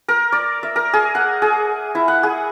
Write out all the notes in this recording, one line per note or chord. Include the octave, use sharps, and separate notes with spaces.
A#4
D5
E5
A#4
G#4
F#5
G#4
E4
F#5
G#4